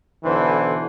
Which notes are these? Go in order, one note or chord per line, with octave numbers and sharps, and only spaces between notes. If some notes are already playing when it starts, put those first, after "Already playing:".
B1 D3 E3 B4 C5